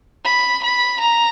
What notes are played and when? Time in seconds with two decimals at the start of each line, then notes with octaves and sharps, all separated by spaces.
0.25 B5
0.63 B5
1.01 A#5